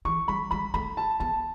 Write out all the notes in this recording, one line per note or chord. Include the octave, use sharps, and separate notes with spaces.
E3 C#6
G3 B5
G3 B5
A3 B5
A5
B3 A5